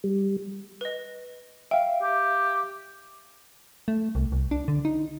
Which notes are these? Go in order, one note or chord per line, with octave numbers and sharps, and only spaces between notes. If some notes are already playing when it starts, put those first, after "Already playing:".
G3
B4 D#5
E5 F5 G5
G4
A3
C2
C2
D4
D3
D#4